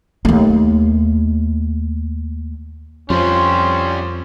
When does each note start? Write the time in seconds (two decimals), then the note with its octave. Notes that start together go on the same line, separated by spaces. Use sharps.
0.25 D#2 A3
3.10 F2 F3 G3 C4 C#4 C6